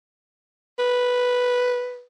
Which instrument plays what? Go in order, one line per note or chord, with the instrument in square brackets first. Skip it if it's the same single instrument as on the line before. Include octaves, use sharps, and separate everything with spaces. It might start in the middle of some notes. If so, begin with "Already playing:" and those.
[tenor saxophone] B4